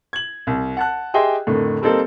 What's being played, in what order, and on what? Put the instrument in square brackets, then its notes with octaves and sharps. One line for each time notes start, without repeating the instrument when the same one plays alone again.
[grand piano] G#6 F#7
C2
F#5 A5 F#6
G4 G#4 D#5 E5 G5 C6
F2 A2 D3 D#3
G3 A#3 C4 D#4 A4